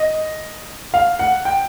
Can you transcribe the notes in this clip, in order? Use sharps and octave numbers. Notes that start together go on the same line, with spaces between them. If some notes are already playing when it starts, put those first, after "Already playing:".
Already playing: D#5
F5
F#5
G5